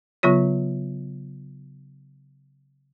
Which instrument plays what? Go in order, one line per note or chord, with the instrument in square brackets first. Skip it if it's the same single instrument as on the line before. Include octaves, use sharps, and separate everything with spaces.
[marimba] C#3 F#3 B3 F4 C#5